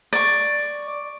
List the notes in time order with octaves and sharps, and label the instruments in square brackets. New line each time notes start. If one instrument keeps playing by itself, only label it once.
[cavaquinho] D5 C#6